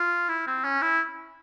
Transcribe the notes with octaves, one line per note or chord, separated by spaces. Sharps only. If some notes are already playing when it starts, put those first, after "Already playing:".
Already playing: F4
E4
C4
C#4
E4